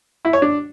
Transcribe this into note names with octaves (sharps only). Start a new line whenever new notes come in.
E4
C#5
D4